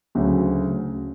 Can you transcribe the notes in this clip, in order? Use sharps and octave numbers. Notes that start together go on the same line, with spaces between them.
D2 C#3 F#3 C#4